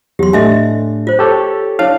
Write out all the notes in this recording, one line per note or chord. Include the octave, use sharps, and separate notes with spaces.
E2 F#3 G4 C6
A2 A3 D4 D#5 E5 G#5
F4 C5
G4 A4 C#5
D4 E4 C#5 F5 A5